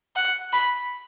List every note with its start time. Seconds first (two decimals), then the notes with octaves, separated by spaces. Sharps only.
0.16 F#5
0.53 B5